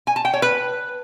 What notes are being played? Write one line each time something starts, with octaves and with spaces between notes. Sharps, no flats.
G#5
A5
G5
C#5
B4